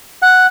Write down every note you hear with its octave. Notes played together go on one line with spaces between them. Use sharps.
F#5